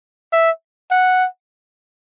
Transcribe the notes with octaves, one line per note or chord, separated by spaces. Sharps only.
E5
F#5